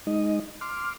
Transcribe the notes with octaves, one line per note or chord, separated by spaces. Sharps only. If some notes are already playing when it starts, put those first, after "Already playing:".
G#3 D#4 D#5
C6 D6 F6